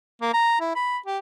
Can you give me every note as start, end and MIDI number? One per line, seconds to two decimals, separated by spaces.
0.22 0.32 58
0.34 0.56 82
0.60 0.75 64
0.76 0.98 83
1.06 1.18 67